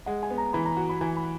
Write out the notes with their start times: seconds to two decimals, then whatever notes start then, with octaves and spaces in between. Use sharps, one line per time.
0.06 G#3 F#5
0.23 G#5
0.30 B3
0.38 A#5
0.53 E3 B5
0.65 A#5
0.77 F#4
0.89 B5
1.01 E3 G#5
1.17 B5